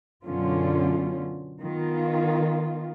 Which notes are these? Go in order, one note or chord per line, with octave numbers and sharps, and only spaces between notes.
F#2 B2 D3 C#4 F4
D#3 B3 F4